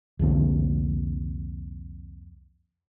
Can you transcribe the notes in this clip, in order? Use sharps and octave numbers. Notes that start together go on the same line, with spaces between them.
C2 F2 D3 A#3